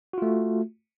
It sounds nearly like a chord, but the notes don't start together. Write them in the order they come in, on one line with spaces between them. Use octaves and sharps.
F#4 F4 A3